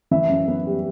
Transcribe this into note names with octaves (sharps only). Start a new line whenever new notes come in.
E3 E5
F#2
B3
G3